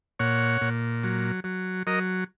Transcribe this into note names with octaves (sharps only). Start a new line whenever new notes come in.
A#2 C#5 F#5
A#2
F#3
F#3
F#3 A#4 D#5